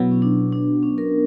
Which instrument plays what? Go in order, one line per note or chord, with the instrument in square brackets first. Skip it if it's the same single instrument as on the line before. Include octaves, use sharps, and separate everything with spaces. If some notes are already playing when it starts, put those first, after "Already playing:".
Already playing: [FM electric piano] B2 F#3 B3 [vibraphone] E4
[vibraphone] C#4
D4
D4
C#4
A#4